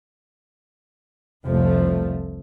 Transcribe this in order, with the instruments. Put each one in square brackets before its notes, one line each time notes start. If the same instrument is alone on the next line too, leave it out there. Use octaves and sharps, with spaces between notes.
[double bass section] F1 C2 F3 A3